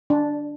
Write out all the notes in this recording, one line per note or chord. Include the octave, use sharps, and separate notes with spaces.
D4